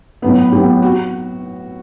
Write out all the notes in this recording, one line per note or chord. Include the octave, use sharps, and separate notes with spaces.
A2 F#3 B3 B4
A2 F#3 B3 G4
F#4